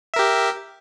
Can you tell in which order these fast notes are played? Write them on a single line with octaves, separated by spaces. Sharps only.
E5 A#4 G4